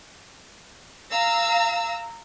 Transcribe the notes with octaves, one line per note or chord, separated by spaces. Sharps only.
F5 A#5 E6